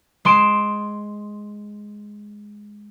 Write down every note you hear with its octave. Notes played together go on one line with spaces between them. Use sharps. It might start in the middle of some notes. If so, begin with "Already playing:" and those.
G#3 C6 D7 E7